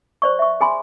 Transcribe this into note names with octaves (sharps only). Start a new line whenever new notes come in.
C5 D5 C#6
E5 C#6
G#4 G#5 B5 C6